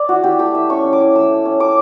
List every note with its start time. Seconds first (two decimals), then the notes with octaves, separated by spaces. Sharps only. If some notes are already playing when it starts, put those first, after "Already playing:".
Already playing: D5
0.09 E4 F#4
0.24 E4 G4
0.39 A3 G4
0.54 E4 E5
0.70 C#4 C#6
0.84 C#4
0.93 D6
1.00 E4
1.15 A3 E6
1.30 A3
1.45 C#4
1.60 C#4 D6